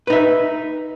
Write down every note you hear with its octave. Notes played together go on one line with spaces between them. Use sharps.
D#4 B4 E5